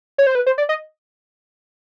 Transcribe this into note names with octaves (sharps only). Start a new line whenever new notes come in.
C#5
C5
B4
C5
D5
D#5